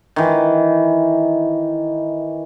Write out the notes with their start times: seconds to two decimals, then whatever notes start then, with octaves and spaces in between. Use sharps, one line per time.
0.16 D#3 E3